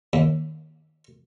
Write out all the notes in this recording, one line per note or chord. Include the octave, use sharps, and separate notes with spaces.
D#2